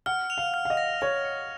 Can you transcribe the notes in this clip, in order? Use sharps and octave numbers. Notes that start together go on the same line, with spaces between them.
F#5 F6
F7
F5
F6
F5
D#5
A#6
C#5 F7
C#7